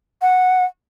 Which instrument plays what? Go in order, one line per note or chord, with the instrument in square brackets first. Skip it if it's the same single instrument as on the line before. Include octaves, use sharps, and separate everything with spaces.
[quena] F#5